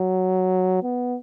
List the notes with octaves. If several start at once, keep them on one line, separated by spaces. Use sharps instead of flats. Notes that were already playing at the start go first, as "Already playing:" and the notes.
Already playing: F#3
B3